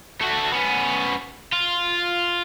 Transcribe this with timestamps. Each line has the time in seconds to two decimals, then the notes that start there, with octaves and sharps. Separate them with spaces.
0.21 A3 F#4
0.52 B3 C#4
1.53 F4